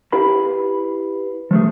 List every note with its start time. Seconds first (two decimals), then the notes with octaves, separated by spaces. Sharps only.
0.12 E4 G4 B4 F5 B5
1.51 F3 A3 G#4